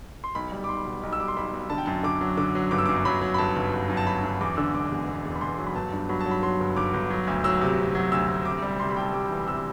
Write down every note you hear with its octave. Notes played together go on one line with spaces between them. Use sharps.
C6
B1 B5
G3
D6
B1 C6
B2
B1
E6
G3 D6
C6
B1 B5
B1
D3 A5
G5
F#2 A5
D3 D6
F#3
D3 D6
F#3
G1 D6
E6
D6
F#2
F#3 B5
F#3
B5
G1 A5
G1
G1
F#2
A5
F#3 B5
F#2
E2 D6
D3 E6
E1 D6
E2
E1
E2
B5
E2 C6
F#3
B5
G1 A5
G2
F#3 B5
A5
F#3
B5
F#3 C6
G1
G1 D6
G1
F#3
D2
F#3 E6
C3
C3
F#3
D2 E6
D2
C3 D6
G3
C3 C6
B5
G3 G5
A5
G3 D6
E3
C3 E6